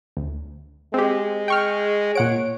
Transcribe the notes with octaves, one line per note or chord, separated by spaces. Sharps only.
D2
G#3 C4 G4
G5 C#6 F6
A#2 C#5 F#5 D7